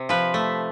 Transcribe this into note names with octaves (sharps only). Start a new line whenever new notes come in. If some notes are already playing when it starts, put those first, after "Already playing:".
Already playing: C3
F3 B4
A3